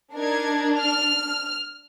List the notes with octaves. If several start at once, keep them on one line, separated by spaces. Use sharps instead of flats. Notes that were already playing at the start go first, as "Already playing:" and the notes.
D4 D#4 A#4 G#6
F6